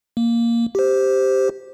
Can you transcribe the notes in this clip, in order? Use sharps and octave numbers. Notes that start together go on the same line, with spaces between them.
A#3
G4 C5